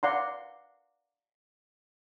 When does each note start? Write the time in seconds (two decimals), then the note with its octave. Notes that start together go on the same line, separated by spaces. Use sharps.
0.03 D5 F5 F#5 A#5 C6